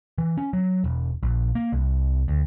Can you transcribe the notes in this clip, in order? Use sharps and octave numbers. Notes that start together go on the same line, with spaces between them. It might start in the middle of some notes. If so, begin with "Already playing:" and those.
E3
C#4
F#3
E1
A#1
A#3
C2
D2